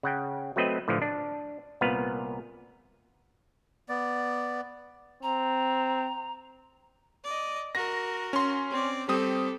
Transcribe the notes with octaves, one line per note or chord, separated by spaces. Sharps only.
C#3 F#5 G5
F#3 A3 C4 B4 D#5
A2 D3 E3 F3
D4
C2 A#2 B3 B4 F5
B3 D5
C4 A#5
D5 D#5
F#4 A#4 A#6
C#4 C6
C4 D5
G3 C4 G4 A4 D#6